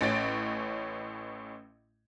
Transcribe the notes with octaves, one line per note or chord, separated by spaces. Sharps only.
A1 A2 C#4 A6 D7